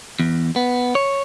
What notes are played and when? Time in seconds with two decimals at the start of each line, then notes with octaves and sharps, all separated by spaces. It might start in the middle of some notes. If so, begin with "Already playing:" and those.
0.20 E2
0.56 B3
0.95 C#5